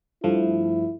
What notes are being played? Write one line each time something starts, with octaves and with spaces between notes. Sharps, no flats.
G2 F3 A3 E4